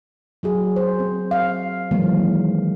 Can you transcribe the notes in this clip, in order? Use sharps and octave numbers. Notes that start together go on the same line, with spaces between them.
F#3 F#4 G#4
C5
C4
F5
D#3 E3 F#3 G#3 A#3